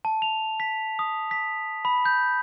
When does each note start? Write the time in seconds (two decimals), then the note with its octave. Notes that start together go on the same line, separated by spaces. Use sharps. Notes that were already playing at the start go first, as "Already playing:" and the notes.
0.05 A5
0.22 F7
0.60 B6
0.99 D#6
1.31 B6
1.85 B5
2.05 G6